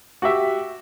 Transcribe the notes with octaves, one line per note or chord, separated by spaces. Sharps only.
F#4 G4 E5